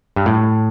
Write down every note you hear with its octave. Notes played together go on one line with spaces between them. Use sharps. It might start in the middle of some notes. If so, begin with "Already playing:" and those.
G2
A2